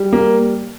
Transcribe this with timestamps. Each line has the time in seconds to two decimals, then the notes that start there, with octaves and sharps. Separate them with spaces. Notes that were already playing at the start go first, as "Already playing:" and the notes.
Already playing: G3
0.13 A#3